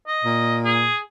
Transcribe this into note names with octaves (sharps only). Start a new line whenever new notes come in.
D#5
A#2
G#4